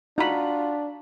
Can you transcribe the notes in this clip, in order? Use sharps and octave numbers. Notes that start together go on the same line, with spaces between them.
D4 D#4 F4 F#4 A#5 B5